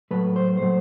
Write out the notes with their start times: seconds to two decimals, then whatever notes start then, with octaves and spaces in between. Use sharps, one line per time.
0.11 A2 F#3 A3 B4
0.36 C5
0.57 A2 F#3 A3 C5